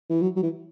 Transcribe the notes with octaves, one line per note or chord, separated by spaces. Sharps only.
E3
F#3
F#3
E3